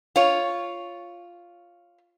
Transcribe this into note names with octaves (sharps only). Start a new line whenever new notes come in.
F4 C#5